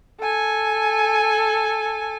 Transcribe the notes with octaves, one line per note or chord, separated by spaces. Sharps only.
A4 G#5